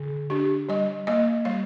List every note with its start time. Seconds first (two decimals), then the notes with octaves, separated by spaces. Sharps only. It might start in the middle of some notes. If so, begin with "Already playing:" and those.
Already playing: D3
0.30 D4 G4
0.69 G3 D#5
1.07 A#3 D#5
1.45 G3 F5